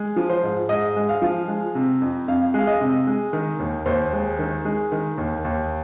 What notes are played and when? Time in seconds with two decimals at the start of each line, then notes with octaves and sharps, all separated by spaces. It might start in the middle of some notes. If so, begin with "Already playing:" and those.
Already playing: G#3
0.16 F3
0.30 C5
0.43 G#2
0.69 G#2 D#5
0.96 G#3
1.09 F5
1.22 F3
1.48 G#3
1.75 C3
2.02 F2
2.28 F2 F5
2.54 G#3 F5
2.67 D#5
2.81 C3
3.07 G#3
3.33 D#3
3.59 D#2
3.86 D#2 C5
4.13 G#3
4.39 D#3
4.65 G#3
4.92 D#3
5.18 D#2
5.45 D#2